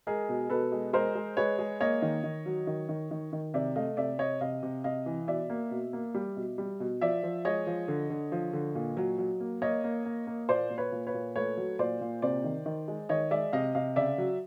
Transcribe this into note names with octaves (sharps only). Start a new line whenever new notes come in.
G#3 G#4 A#4
B2
B2 A4 B4
G#3
G#3 A#4 C5
G#3
G#3 B4 C#5
G#3
A#3 C#5 D#5
D#3
D#3
F#3
D#3
D#3
D#3
D#3
C3 D5 E5
A3 D#5 F5
C3 D5 E5
C3 C#5 D#5
C3 D#5 F5
C3
C3 D#5 F5
E3
B2 D5 E5
A#3
B2
A#3
G3
B2
G3
B2
F3 D5 E5
F3
G#3 C#5 D#5
F3
D3
D3
F3
D3
A#2
F#3
F#3
A#3
A#3 C#5 D#5
A#3
A#3
A#3
A#2 C5 D5
A#2
B4 C#5
A#2
B4 C#5
A#2
A3 B4 C#5
F#3
A#2 C5 D5
A#2
C3 C5 D5
D#3
D#3
G#3
D#3 C#5 D#5
G#3 D5 E5
C3 D#5 F5
C3 D#5 F5
C#3 D5 E5
F#3